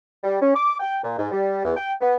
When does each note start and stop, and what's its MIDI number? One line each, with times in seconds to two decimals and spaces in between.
0.23 0.37 55
0.41 0.51 61
0.55 0.75 86
0.80 0.97 79
1.03 1.16 46
1.18 1.29 44
1.32 1.63 55
1.65 1.72 40
1.77 1.92 79
2.01 2.15 59